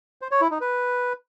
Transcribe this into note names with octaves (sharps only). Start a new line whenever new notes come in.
C5
C#5
E4
D#4
B4